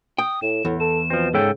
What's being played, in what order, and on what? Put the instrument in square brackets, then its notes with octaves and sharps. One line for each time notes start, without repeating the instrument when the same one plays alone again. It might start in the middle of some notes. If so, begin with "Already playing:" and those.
[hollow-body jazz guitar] G5 [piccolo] D#6
[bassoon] A2 [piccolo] E7
[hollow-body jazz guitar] E2 [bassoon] A2
[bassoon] A4 [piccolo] E7
[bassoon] B2 [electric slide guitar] F3 C4
[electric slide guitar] G#2 A4 G5 [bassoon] C#3